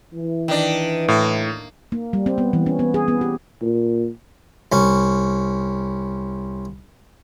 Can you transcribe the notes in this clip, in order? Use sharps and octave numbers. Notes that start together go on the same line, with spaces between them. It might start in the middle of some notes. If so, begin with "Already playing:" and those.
E3
D#3 D4
A2 A#3
A#3
G3
C4
B3
E3
C#4
B3
G#4
B3
G4
A#2
C2 C#4